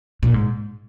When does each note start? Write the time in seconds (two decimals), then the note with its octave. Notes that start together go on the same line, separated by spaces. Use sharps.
0.23 A#2
0.34 G#2